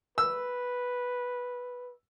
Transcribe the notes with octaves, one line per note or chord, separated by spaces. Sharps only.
B4 E6